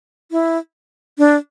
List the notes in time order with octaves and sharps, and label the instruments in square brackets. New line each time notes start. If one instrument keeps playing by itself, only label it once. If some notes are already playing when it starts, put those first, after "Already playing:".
[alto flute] E4
D4